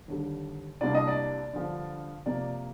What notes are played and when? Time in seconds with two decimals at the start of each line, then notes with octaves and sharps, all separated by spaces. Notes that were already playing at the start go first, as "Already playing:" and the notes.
0.08 D#2 D3 G3
0.81 C2 C3 G3 A#3 D4 D5
0.94 D#5
1.08 D5
1.53 G2 D3 F3
2.26 C3 F3 A#3 D5